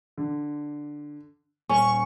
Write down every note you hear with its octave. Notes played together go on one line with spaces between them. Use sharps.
D3
D#1 C#4 C#6